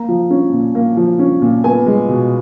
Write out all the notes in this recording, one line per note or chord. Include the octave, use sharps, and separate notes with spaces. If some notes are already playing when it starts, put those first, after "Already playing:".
Already playing: A#3 A#5
F3
C#4
A#2
A#3
F3
C#4
A#2
B3 G#5
G#3
B2